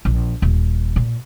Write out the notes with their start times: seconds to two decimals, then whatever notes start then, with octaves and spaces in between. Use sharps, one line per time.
0.05 A#1
0.42 D#1
0.96 A#2